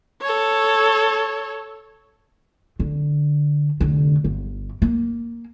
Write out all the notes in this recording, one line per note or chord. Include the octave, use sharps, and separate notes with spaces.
A4 C#5
D3
F1 D3
G1
A#3